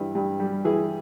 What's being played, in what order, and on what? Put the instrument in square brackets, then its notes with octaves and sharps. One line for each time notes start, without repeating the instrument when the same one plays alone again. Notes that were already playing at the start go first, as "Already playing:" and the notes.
Already playing: [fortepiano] G2 E3
G2
G3
E3 G#4